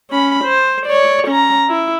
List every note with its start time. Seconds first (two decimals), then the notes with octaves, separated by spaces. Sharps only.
0.11 C#4 B5
0.44 C5
0.86 C#5 D5
1.27 C#4 A#5
1.69 E4